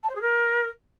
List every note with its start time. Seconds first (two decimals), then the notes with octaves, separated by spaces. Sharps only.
0.03 A5
0.09 C5
0.15 G#4
0.21 A#4